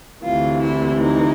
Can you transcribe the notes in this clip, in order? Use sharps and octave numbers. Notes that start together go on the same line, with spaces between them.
D2 C3 E3 F4
E4
D#4